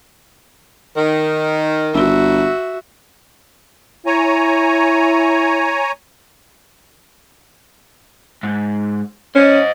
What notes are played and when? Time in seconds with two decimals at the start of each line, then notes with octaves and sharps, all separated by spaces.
0.96 D#3
1.94 G1 F#4 E5
4.06 E4 C#5 G#5 A#5
8.43 G#2
9.35 C#4 C5 D#5